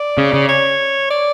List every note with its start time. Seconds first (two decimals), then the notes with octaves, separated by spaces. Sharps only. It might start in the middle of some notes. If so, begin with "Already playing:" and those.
Already playing: D5
0.18 C#3
0.33 C#3
0.48 C#5
1.10 D5